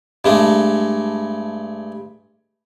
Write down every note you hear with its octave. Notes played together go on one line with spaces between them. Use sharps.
G2 G#3 A3